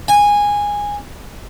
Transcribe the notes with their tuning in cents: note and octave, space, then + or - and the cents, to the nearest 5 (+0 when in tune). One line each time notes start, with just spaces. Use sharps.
G#5 -15